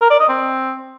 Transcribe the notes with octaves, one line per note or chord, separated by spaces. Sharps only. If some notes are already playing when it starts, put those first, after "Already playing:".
A#4
D5
D#5
C4